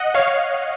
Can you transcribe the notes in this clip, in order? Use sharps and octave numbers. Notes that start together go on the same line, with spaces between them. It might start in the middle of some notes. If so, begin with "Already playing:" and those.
Already playing: D#5 F#5
C#5 F5